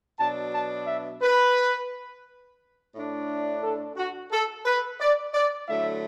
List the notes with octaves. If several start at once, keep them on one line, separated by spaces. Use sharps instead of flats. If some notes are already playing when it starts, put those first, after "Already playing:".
B2 F#3 D4 A5
A5
E5
B4
A2 A3 D4
A4
F#4
A4
B4
D5
D5
D3 F#3 A3 E4 E5